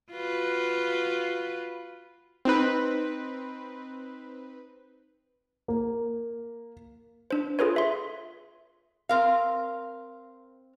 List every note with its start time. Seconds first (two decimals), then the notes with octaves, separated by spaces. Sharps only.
0.12 F4 F#4 B4
2.45 C4 D#4 B4
5.68 A#3
7.31 D4 C5
7.59 F4 G#4 A4 B4 C#5
7.76 E5 C6
9.09 C4 A#4 F5